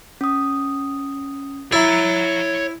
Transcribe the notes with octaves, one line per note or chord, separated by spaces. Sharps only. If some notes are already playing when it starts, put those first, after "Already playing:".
C#4 D#6
E4 C#5 A#5 A6